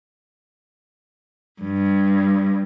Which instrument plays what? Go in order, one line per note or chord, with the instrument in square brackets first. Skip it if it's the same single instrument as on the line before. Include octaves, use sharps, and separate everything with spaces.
[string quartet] G2